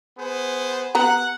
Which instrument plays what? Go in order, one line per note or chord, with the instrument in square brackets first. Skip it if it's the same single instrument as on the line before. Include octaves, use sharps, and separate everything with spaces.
[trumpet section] B3 G#4 C5
[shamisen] B3 G4 A#5 [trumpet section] F#5